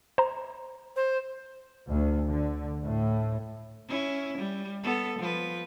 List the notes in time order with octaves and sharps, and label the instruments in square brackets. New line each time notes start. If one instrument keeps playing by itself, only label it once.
[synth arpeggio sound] C5 A#5
[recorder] C5
[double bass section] D2
D3
A2
[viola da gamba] C#4 E4
G3
B3 A4
F3 B4